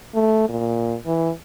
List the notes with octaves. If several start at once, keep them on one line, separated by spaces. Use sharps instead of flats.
A3
A#2
E3